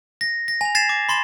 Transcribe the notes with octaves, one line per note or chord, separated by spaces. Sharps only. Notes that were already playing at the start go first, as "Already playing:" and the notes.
A#6
A#6
G#5 F7
G#6 A6 C7 E7 F7
D6
B5 C6 A6 E7